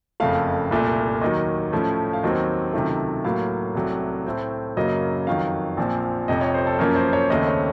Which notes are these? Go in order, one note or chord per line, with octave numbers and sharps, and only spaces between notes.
F#1 F2 C#3 A3 F5
C2 A#2 A3
D#2 D#3 F#3 D#5
A2 F3 A3 C#4
F5
D#2 D#3 F#3 C4 D#5
C#2 C3 D#3 F#3 A3
A2 F#3 A#3 F5
C2 C3 F#3 A3
A2 A3 C4
F#2 C#3 F#3 A#3 D#5
F2 D#3 F#3 F5
A#1 A#2 F3 C4
F1 F2 C3 D#5
C#5
C5
A4
F#2 F3 A#3 C#4 A#4
C5
C#5
D#2 C#3 A3 C4 D#5
C#5